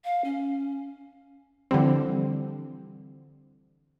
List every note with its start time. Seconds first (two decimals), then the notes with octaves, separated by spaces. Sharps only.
0.04 F5
0.24 C#4
1.71 D3 E3 F3 G3 C4